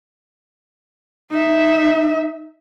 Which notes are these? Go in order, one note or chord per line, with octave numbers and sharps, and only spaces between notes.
D#4 E5